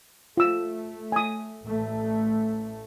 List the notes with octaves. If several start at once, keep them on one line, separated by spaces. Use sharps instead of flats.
A3 F4 E6
G#5 D#6
A1 A3